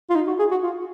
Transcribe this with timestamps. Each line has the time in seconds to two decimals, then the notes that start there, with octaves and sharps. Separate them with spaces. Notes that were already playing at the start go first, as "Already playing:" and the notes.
0.10 F4
0.15 D#4
0.27 F#4
0.39 G#4
0.51 F#4
0.63 F4